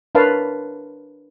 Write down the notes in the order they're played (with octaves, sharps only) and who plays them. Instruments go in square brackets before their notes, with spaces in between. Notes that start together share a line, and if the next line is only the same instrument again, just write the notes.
[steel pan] D4 A#4 B4 C#5 F5 A5